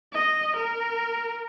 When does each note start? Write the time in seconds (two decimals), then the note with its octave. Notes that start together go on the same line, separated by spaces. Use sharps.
0.13 D#5
0.57 A#4